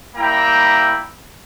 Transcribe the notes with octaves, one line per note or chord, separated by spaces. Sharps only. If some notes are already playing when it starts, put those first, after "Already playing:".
G3 A#3 E4 E5 G5 A#5